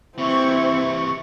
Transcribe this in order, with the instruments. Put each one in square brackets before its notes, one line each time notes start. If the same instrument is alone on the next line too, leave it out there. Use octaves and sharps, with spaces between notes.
[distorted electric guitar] C3 E3 [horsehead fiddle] C4 [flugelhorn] E4 [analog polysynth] C#6